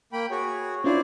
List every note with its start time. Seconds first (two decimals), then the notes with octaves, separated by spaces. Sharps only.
0.13 A#3 G5 B5
0.30 F#4 G#4 C#5
0.84 C#4 D4 E4 F4 C5 D5